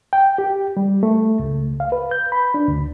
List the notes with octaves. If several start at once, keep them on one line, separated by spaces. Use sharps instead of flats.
G5
G4
G3
A3
C#2
F5
B4
G6
B5
D4
D2